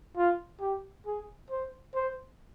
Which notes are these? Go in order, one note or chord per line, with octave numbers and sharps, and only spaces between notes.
F4
G4
G#4
C5
C5